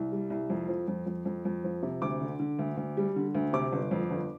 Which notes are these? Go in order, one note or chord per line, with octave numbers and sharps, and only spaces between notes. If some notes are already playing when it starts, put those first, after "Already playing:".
Already playing: C2
G3
C2
F2
F3
F2
F2
F2
F2
F3
C3
D2 D6
D3
D3
D2
D2
G3
D3
D2
C3 D6
G1
F2
G1